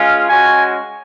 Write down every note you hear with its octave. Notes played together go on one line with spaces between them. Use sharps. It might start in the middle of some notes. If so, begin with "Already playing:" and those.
Already playing: G#3 C#4 F4
G#3 C#4 F#4 G#5